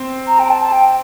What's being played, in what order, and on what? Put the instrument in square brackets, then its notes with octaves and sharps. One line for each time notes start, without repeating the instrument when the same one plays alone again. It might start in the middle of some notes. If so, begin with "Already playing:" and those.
Already playing: [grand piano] C4
[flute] A#5
G5
A5
A5
G5